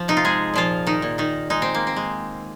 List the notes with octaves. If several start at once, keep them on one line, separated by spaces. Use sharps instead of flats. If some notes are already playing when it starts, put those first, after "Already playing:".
Already playing: F3
C3 D#4
F4
G#3 G#4
A#2 F3 F4
D#3 D#4
A#2
D#3 D#4
G#3 D#4
C4
A#3
C4
G#3